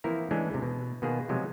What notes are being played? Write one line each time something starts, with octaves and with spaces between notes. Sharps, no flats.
E3 F3 A#3 C4 E4 A#4
E3 G#3 A3 C#4 D4
D#2 C3
B2
B2 D#3 A#3 B3 F4 G#4
C3 F3 F#3 G#3